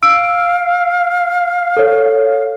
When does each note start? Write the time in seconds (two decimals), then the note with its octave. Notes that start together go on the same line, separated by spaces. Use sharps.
0.03 F5 E6 D7
1.77 A4 C#5